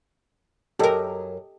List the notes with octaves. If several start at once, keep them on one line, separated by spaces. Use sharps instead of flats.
F#2 G4 A4 A#4 D#5